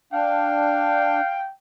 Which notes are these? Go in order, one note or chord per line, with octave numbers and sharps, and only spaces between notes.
D4 F5 G5